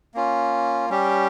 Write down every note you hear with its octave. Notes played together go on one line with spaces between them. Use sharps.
A#3 C#4 F4
G3 C#4 G4